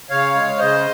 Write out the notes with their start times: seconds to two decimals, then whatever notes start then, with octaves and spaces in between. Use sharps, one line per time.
0.10 C#3 C#5 F5
0.35 G#3
0.58 C#3 C5 D#5